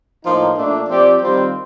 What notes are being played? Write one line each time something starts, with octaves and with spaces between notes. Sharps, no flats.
A2 F3 A#3 D#4
A#2 A3 D4
F3 C4 G4 D5
D#3 G3 C4 F4 C5